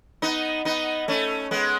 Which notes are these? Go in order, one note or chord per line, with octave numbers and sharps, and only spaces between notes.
B3 D#4
B3 D#4
A3 C#4
G#3 B3